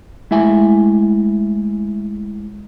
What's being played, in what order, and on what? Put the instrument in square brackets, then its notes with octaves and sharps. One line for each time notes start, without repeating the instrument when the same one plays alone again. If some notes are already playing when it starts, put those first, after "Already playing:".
[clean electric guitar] G#3 A3 E4 E5 G#5